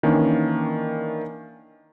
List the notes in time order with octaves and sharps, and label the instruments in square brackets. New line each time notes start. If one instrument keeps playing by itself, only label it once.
[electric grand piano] D#3 E3 A#3 C#4 D4